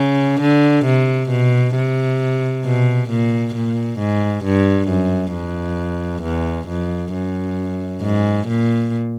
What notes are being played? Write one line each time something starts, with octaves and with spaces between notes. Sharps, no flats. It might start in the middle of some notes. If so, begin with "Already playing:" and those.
Already playing: C#3
D3
C3
B2
C3
B2
A#2
A#2
G#2
G2
F#2
F2
E2
F2
F#2
G#2
A#2